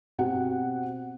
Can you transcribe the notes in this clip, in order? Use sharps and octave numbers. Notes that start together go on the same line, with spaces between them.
B2 C4 F#4 G4 F#5